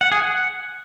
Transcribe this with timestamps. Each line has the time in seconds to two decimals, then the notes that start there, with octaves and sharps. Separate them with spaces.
0.01 F#5
0.12 G#4
0.22 F#5